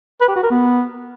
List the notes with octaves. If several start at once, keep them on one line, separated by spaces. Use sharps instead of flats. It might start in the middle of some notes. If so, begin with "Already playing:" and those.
B4
G4
F#4
A#4
B3